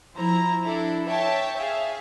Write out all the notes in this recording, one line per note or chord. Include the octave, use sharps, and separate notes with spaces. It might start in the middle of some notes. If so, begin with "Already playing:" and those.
F3 E4 C5 A#5
D4 E4 A4
C#5 E5 G5 A5
G#4 E5 F5